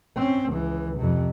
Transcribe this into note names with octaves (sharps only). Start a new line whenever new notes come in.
C4 C#4
C#2 E3
F2 C3